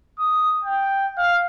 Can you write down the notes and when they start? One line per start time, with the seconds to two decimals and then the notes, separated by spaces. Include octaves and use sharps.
0.19 D#6
0.64 G5
1.17 F5